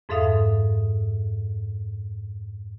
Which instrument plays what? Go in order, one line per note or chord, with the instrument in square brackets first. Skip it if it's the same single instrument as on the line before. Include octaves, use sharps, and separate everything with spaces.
[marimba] F2 G#2 A4 E5 F5 D#6